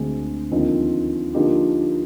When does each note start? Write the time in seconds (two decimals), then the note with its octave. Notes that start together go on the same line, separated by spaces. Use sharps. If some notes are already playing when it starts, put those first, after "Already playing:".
Already playing: D2 D3 G#3 C4
0.51 D#2 D3 F3 C4 D#4
1.34 D3 F3 A#3 D#4 G4